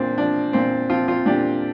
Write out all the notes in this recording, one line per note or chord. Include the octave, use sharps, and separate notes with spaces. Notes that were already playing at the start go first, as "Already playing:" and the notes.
Already playing: A#2 F3 C4 D4
F3 D4
A#2 C4
F3 C4 F4
C4 F4
A#2 D4 G4